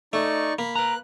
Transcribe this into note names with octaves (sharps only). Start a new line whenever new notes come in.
A3 D#4 D5 C#6
A#3 B5
B4 A#5 F#6